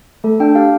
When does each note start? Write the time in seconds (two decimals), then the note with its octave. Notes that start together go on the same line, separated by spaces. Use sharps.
0.24 A3 A4
0.40 D4 G5
0.55 G4 F5